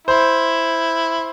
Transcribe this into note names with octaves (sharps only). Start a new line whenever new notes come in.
E4 C5